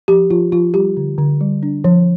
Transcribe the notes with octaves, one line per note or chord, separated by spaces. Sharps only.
F3 G4
F3 F4
F3 F4
G3 G4
D3
D3
G3
D4
F3